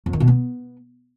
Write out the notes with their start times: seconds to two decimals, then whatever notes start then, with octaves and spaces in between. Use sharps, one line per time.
0.06 F2
0.13 D#3
0.20 B2
0.27 B3